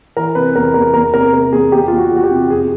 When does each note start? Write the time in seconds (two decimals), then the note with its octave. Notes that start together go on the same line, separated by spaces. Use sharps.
0.17 E3 A#4
0.35 C3 B4
0.56 E2 A#4
0.74 E2 A#4
0.94 E2 A#4
1.14 C3 A#4
1.33 C3 A#4
1.52 E2 G#4
1.72 E2 G4
1.88 E2 F4
1.98 F#4
2.11 E2
2.16 F#4
2.24 G4
2.31 C3
2.50 F2 G#4